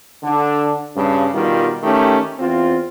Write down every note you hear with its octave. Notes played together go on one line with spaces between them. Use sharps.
D3 D4
G2 C#3
B2 D#3 G3 F4
D#3 A3 C#4 G4
E2 C4 F4